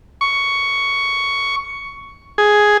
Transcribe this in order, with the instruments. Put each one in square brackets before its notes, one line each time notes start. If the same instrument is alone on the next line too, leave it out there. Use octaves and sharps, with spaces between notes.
[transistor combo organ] C#6
G#4